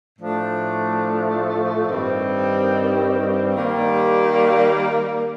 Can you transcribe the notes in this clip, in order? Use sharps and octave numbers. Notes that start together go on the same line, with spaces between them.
A2 F3 A3 D4
G2 D#3 G3 C4
D#3 G3 A#3